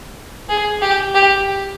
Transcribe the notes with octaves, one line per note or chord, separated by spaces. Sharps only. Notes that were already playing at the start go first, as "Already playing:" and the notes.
G#4
G4
G4